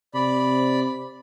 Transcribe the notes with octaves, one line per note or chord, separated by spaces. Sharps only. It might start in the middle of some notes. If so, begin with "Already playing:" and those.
C3 D5 B5